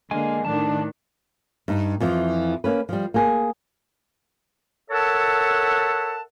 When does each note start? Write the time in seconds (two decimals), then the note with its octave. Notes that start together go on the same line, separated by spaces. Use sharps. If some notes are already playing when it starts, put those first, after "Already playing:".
0.11 D3 G#3 A#3 G#5
0.45 A2 D#3 D4 A5
1.68 G2 D#4
2.00 F2 E3 F3
2.64 A#3 C#4 B4
2.89 F3 G3
3.14 A#3 G#4
4.90 A4 A#4 C#5 E5 F#5 A5